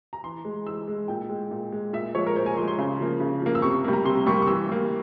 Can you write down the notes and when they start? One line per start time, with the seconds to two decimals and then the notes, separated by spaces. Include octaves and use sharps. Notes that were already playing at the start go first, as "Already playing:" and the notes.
0.13 A#5
0.24 E3 C6
0.45 G#3
0.67 E3 E6
0.88 G#3
1.08 A#2 G5
1.29 G#3
1.51 A#2
1.72 G#3
1.93 A#2 E5
2.15 F3 G#3 C#5
2.27 A#4
2.36 A#2 C5
2.46 G#5
2.57 F3 G#3 C6
2.68 C6
2.78 C#3
3.00 F3 A#3
3.20 C#3
3.42 F3 A#3
3.55 E6
3.62 C3 C#6
3.84 G3 A#3
3.93 A#5
4.05 C3 C6
4.26 G3 A#3 C#6
4.42 C#6
4.47 E3 E6
4.69 G3 A#3